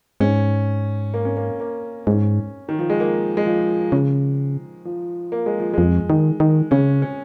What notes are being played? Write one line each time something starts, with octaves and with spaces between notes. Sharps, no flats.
G#2 C#4
A#3
C#4
A#3
A#3
G#2 C#4
D#3
F3
G#3
A#3
G#3
F3
C#3
F3
A#3
G#3
F3
F2 G#3
D#3
D#3
C#3 C#4
C#4